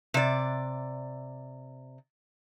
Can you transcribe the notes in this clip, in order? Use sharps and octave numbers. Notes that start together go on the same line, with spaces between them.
C3 D5